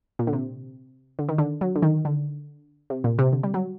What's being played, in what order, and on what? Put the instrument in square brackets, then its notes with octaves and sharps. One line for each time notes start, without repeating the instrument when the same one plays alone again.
[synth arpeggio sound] A#2
D3
C3
D3
D#3
D3
F#3
D3
D#3
D3
C3
A#2
C3
D3
G3
F#3